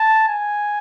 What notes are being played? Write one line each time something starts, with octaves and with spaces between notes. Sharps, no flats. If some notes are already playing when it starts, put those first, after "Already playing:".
Already playing: A5
G#5